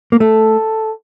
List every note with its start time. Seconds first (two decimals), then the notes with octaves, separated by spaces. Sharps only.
0.12 A#3
0.20 A3 A4